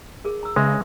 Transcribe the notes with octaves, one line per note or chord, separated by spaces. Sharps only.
G#4 A#4
A#5 E6
C#3 G#3 B4 E5